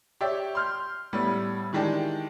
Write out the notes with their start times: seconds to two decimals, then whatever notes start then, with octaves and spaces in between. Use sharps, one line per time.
0.21 G4 C#5 D5 E5
0.55 C6 F6 G6
1.13 A2 G3 B3
1.73 D#3 E3 G#3 D4 G4